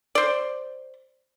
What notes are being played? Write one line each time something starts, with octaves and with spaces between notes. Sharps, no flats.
C5 D5